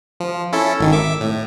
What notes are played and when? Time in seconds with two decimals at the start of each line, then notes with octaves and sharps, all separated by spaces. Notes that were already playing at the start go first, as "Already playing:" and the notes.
0.20 F3
0.53 C#4 E4 A4
0.79 G#1 D#3
0.92 E5 D6
1.21 A2